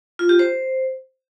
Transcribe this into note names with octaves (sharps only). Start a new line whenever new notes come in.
F4
G4
C5